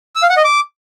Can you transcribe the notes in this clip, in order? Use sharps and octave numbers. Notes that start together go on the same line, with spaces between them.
E6
F5
F#5
D#5
D6